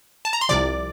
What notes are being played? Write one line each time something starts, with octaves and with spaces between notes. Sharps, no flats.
A5
A#5
C6
C2 C3 F3 D5 D6